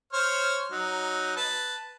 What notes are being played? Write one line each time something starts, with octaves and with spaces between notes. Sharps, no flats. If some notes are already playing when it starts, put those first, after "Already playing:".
C5 C#5 F6
F#3 D#4
B4 A5